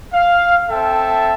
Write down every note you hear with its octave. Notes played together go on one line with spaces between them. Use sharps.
F5
C4 A4 E5 G5 A5